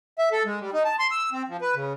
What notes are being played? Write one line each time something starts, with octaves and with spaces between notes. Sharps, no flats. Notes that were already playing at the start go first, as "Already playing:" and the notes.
E5
A4
G#3
G3
D#4
A5
C6
E6
C4
F3
B4
C#3